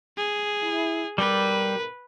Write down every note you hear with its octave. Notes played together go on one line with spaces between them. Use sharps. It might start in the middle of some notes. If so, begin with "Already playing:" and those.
G#4
E4
G#2 B2 G3 A#4 B4